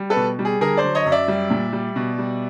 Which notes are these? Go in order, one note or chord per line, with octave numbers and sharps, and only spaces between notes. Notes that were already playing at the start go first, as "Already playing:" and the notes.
Already playing: G3
A4 B4
B2
G3
G#4
D3 G#4 A#4
C5 D5
F#3
C#5 D#5
F#2
D5 E5
G3
A#2
G3
B2
G3